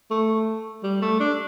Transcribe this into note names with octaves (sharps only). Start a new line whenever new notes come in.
A3
G3
A3
D4